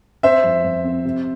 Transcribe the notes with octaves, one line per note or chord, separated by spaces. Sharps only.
C4 C5 E5
F2
F2
C4
C3